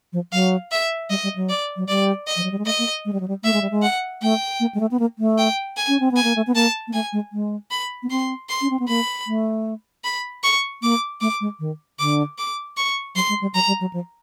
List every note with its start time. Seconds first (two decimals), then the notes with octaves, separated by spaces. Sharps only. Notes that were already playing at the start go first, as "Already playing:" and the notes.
0.13 F3
0.32 F#3 F5
0.72 E5
1.10 G3 D#5
1.23 G3
1.36 F#3
1.49 D5
1.77 F#3
1.88 G3 D5
2.27 D#5
2.36 F3
2.43 F#3
2.52 G3
2.58 G#3
2.65 A3 D#5
2.78 A#3
3.05 G#3
3.13 G3
3.20 F#3
3.28 G3
3.43 A3 E5
3.53 G#3
3.62 G3
3.71 G#3
3.82 F#5
4.22 A3 G5
4.60 A#3
4.75 G#3
4.80 A3
4.91 B3
4.99 A#3
5.19 A3
5.38 G5
5.77 G#5
5.88 C#4
6.00 C4
6.11 B3 G#5
6.24 A#3
6.36 A3
6.47 B3
6.55 A#3 A5
6.88 A#3
6.93 A3 G#5
7.13 G#3
7.33 G#3
7.71 B5
8.03 B3
8.10 C4 C6
8.49 C6
8.61 C#4
8.70 C4
8.80 B3
8.88 A#3 B5
9.27 A3
10.04 B5
10.43 C#6
10.82 A#3 D6
11.21 A3 D6
11.41 G#3
11.60 D#3
11.99 D3 D6
12.38 D6
12.77 C#6
13.15 F#3 C6
13.29 G#3
13.41 G3
13.54 F#3 A#5
13.67 G3
13.81 F#3
13.93 F3